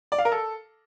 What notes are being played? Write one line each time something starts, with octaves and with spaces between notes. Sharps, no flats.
D5
F5
A#4
A4